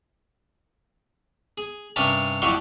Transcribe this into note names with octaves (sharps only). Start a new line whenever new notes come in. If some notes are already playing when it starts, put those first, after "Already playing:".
G#4
G2 C3 C#4 A#4 A5
F2 A2 F#3 G3 C6 C#6